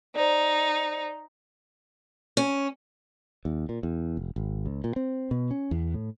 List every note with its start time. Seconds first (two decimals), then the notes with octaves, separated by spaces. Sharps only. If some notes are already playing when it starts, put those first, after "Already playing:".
0.15 D#4 C5 D5
2.37 C#4
3.45 D#2
3.69 A#2
3.83 E2
4.17 F1
4.36 G#1
4.66 C#2
4.84 A#2
4.96 C4
5.31 B2
5.51 C#4
5.71 E2
5.94 A2